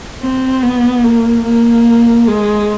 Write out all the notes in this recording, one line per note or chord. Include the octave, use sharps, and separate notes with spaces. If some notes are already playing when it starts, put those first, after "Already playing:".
C4
B3
A#3
A#3
G#3